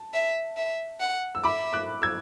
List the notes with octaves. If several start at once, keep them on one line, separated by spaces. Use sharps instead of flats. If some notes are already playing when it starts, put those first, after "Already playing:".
Already playing: A5
E5
E5
F#5
E6
E5 B5 D6
D6 F#6
E6 G#6